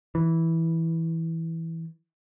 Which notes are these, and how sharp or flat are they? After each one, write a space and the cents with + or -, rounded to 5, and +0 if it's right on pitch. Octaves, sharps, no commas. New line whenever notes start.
E3 -10